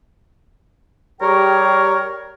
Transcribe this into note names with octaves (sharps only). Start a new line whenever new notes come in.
G3 G4 G#4 A#4 C#5 G5